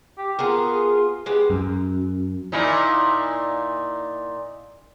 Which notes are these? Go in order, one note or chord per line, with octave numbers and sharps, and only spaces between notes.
G4
B3 F4 G#4 A#4
G#3 B3 G4
F#2
A#2 D#4 E4